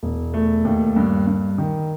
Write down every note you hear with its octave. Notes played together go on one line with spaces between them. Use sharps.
E1
A3
D#2
G2
G2
D#3